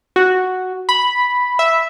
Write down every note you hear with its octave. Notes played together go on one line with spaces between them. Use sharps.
F#4
B5
E5